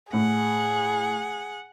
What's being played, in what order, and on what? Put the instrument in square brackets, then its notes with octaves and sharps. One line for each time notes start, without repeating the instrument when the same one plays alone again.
[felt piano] A2 [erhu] G#4 [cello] F#5